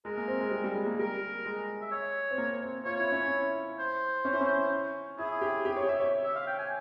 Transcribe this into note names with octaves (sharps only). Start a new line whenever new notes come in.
G#3 A#4
A#3
C4
G#3
G3
G3
G#3
A#3
G3 A#4
G#3
E5
C#5
C4
A#3
C4
F4 C#5
E4
C#4
E4
C5
C#4
E4
C#4
E4 G#4
G4
G4
C#5
E5
C#5
E5
F5
G5
G#5